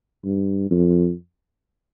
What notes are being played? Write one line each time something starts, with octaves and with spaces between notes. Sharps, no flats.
G2
F2